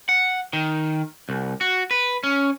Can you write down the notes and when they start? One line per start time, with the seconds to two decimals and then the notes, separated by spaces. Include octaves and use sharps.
0.09 F#5
0.53 D#3
1.29 C2
1.61 F#4
1.91 B4
2.24 C#4